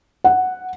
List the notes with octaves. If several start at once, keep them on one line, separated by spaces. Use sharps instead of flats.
F#5